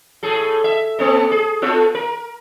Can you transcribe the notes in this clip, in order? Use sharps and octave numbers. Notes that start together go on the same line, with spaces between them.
A2 G#4 A4
E5
A#3 C4 A4
G#4
B3 F4 A4
A#4